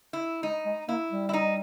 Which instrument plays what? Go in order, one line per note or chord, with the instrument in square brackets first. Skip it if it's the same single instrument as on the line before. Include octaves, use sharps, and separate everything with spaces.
[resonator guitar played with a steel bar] E4
[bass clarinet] G#3 [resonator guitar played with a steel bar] D#4
[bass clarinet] G#3
[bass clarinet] A#3 [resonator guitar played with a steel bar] E4
[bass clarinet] G3
[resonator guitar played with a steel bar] E4
D#4